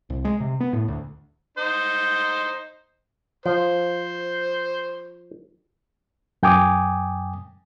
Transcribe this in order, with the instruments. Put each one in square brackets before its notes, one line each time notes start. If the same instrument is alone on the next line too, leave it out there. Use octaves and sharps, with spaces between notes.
[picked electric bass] C2
G#3
C3
B3
A2
D2
[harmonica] D#4 C5
[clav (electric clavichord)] F3 [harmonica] C5
[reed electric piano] F#2 G5 G#5 D6 D#6